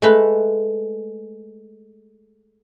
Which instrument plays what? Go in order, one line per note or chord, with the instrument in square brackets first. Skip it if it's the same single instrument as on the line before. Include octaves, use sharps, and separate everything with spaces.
[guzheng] G#3 A3 B4